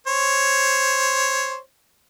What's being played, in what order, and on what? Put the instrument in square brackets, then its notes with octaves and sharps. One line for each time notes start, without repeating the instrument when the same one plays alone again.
[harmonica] C5 C#5